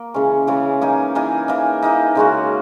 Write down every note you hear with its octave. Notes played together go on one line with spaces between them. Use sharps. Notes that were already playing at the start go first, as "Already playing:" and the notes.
Already playing: A#3
C#3 E3 G#3 C#4
C#3 E3 G#3 C#4
E3 A#3 D#4 G#4
E3 A#3 D#4 G#4
E3 A#3 D#4
E3 A#3 D#4
C#3 G#3 C#4 F#4